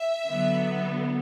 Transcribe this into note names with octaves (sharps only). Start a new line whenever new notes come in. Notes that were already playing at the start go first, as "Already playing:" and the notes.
Already playing: E5
D3 F#3 B3